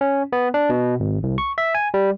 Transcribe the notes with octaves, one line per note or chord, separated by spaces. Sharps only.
C#4
B3
D4
B2
G#1
C2
C#6
E5
G#5
G3